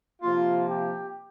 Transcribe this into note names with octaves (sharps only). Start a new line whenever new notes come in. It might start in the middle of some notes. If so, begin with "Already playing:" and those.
C3 F3 A#3 F4
G4